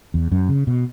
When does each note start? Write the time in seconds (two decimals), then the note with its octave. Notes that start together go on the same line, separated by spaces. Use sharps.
0.14 E2
0.32 F#2
0.49 C#3
0.67 B2